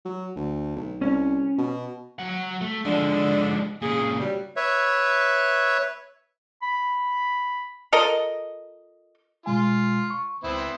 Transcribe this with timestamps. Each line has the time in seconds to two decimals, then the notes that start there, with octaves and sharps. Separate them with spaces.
0.05 F#3
0.36 D2
0.76 B1
1.02 C2 C#4
1.58 B2
2.19 F#3 F#5
2.61 A3
2.85 D3 F3 G#3 D4
3.82 A#2 C#3 G#4
4.19 G2 F#3 G3
4.56 B4 C#5 E5
6.62 B5
7.92 F4 A4 A#4 D#5
9.46 B2 G#3 F4 G#5
10.10 C#6
10.44 C#2 B3 C4 E4